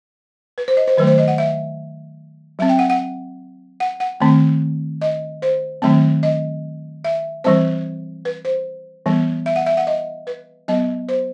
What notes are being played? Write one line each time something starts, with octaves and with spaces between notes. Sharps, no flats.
B4
C5
D#5
C5
D#3 F#3 A3 B4
C5
D#5
F#5
E5
F#3 C4 E5
G5
F#5
F#5
F#5
F#5
D#3 A3 C4
D#5
C5
D#3 F#3 A3 C4
D#5
E5
E3 G3 C4 C5
B4
C5
E3 G3 B3
E5
F#5
E5
F#5
D#5
B4
F#3 B3 D#5
C5